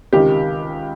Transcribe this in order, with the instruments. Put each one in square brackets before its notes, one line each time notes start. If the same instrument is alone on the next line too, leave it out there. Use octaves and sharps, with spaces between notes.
[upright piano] C#2 C3 D#3 G4